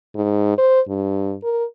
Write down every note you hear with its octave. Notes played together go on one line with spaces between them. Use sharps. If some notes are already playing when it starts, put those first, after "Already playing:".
G#2
C5
G2
A#4